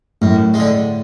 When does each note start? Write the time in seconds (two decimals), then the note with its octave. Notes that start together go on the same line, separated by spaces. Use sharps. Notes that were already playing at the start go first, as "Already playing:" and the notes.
0.21 F#2 A2
0.54 D3 G#3